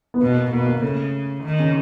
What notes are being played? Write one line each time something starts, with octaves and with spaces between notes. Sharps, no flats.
B3
B2 A#3
A#3
B2 A#3
A#3
C#3 A3
D#3
C#3